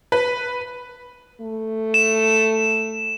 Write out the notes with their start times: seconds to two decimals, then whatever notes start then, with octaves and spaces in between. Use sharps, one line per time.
0.12 B4
1.41 A3
1.94 E7